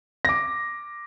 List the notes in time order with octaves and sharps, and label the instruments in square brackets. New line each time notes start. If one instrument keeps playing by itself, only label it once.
[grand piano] D6 A#6